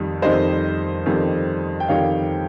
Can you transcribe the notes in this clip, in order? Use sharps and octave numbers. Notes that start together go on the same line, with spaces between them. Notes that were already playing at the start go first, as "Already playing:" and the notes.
Already playing: F2 D#3 G3
F2 D#3 G3 C5 D#5
F2 D#3 G3
G5
F2 D#3 G3 C#5 F5